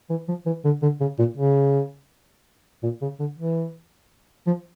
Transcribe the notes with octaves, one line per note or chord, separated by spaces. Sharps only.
E3
F3
E3
D3
D3
C#3
A#2
C#3
A#2
C#3
D3
E3
F3